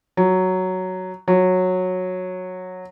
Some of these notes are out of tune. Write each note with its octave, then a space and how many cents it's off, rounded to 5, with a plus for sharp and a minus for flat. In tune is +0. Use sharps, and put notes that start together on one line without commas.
F#3 +5
F#3 -10